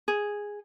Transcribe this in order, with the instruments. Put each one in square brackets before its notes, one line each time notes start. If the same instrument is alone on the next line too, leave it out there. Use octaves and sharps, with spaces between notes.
[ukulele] G#4